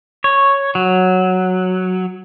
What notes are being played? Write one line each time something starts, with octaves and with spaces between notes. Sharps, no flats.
C#5
F#3